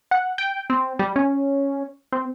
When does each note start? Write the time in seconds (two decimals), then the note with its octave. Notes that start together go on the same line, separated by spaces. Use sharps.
0.11 F#5
0.38 G5
0.70 C4
0.99 G3
1.16 C#4
2.12 C4